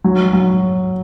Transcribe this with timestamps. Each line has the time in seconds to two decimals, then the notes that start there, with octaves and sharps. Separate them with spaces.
0.04 F#3
0.33 F#3